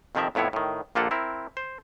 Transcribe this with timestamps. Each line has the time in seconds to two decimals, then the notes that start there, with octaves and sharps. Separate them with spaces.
0.15 F2 C3 D#3 F3 A#4 E5
0.35 F2 A2 B3 E4 C#5
0.53 A2 D#3
0.95 A#1 A#3 F4 G4 A4 F#5
1.11 C4 E4 A#4
1.57 C5